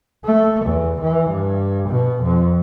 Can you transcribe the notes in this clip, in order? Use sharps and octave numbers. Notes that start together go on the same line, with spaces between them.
A3
E2
E3
G2
B2
F2